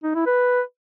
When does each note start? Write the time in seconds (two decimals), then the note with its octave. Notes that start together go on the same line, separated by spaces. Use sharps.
0.03 D#4
0.15 E4
0.26 B4